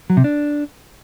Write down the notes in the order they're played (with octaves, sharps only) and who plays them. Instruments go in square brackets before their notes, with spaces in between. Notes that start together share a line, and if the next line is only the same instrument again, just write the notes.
[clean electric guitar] F#3
C3
D4